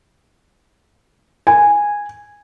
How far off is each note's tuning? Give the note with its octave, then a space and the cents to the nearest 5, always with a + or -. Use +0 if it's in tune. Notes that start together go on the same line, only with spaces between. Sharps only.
G#5 -10